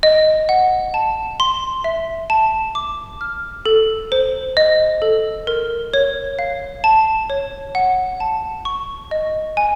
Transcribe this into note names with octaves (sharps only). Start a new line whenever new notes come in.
D#5
F#5
A5
C6
E5
A5
D6
F6
A4
C5
D#5
A4
A#4
C#5
F5
A5
C#5
F#5
A5
C#6
D#5
G#5